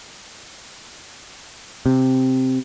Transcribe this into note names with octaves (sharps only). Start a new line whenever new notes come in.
C3